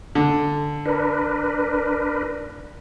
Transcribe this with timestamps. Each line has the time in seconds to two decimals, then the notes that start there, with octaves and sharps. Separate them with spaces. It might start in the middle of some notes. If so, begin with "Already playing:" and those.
0.15 D3
0.86 D4 A#4 B4